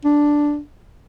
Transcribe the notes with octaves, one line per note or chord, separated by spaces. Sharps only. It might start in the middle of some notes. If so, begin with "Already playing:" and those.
D4